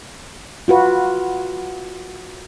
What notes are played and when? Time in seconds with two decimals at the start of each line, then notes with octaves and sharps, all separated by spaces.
0.68 F4 F#4 B4